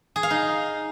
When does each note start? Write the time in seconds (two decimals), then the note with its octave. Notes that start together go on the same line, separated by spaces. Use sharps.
0.16 G#4
0.23 F5
0.31 D#4